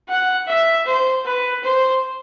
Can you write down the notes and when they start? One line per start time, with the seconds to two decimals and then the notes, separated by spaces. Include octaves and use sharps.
0.09 F#5
0.48 E5
0.86 C5
1.25 B4
1.64 C5